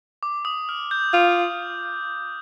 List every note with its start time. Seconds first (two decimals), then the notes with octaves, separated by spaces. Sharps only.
0.23 D6
0.45 D#6
0.69 F6
0.91 G6
1.13 F4